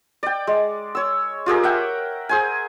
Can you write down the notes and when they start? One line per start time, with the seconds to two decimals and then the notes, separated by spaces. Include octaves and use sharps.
0.23 D5 G5
0.47 G#3
0.95 C#5 E6
1.46 F4 G4 G#4 A#4
1.63 E5 F#5 G5
2.29 G#4 C5 G#5